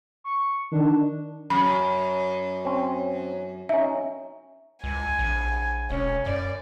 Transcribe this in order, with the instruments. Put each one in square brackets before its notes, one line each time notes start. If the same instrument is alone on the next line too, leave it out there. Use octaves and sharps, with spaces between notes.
[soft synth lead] C#6
[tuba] D#3 [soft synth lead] D4
[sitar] F#2 [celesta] B5
[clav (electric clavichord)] C4 C#4
[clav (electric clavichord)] C#4 D#4 [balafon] E5
[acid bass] C#2 [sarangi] G#5
[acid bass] A#1
[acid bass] E1 [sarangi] C#4
[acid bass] F#2 [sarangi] D5